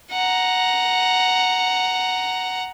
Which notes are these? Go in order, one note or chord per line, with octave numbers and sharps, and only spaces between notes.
F#5 A#5